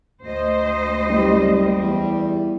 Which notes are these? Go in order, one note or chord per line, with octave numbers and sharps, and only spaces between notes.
D2 C5 D#5
F#1 G3
E2